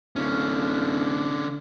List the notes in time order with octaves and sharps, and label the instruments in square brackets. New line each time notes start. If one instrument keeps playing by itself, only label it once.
[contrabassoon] D1 [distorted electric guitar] D3 C#4